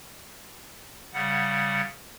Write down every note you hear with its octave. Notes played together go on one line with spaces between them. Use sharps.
C#3 G3 F#5